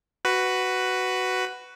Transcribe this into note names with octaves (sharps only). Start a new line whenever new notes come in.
F#4 B4